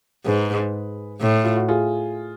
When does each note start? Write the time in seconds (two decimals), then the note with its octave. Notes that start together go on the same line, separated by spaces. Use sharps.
0.26 G#2 G#4 B4
1.21 A2
1.44 F4
1.56 F#4
1.68 F4 G#4